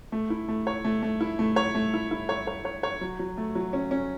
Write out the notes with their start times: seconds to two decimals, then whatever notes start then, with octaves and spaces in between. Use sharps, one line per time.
0.12 A3
0.30 E4
0.48 A3
0.67 C#5
0.85 A3
1.03 A3
1.21 E4
1.39 A3
1.56 C#5
1.75 A3
1.94 E4
2.11 E4
2.29 C#5
2.47 C#5
2.65 C#5
2.83 C#5
3.01 F#3
3.19 F#3
3.38 A3
3.55 F#3
3.73 C#4
3.91 C#4